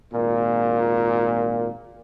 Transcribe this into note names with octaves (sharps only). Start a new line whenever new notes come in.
G#1 A#2